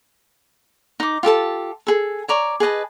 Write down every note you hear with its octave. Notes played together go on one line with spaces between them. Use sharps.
D#4 D6
F4 G4 A4 A5
G#4 A4
C#5 D5 A#5 C#6
G#4 B4 D#5 A5